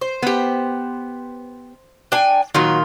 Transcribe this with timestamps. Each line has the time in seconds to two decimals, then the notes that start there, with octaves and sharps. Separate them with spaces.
0.01 C5
0.22 B3 G4
2.12 D4 G5 G#5
2.54 A#2 D#3 F#3 F4